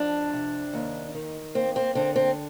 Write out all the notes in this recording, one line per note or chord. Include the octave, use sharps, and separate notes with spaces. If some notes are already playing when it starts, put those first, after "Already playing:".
Already playing: F2 D4
C3
D#2
D#3
A#3 C4
C4
D3 C4
C4